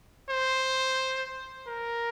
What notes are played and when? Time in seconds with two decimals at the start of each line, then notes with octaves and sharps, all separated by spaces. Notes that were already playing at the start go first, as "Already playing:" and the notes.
0.30 C5
1.67 A#4